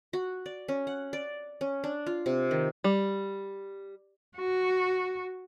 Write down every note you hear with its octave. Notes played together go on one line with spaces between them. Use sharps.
F#4
D5
C#4
F#5
D5
C#4
D4
F4
C3
D#3
G3
F#4